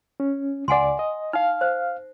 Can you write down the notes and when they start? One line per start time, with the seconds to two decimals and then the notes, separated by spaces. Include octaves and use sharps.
0.20 C#4
0.68 C#2 D5 F#5 G#5 C6
0.99 D#5
1.33 D#4 F5 F6
1.61 C5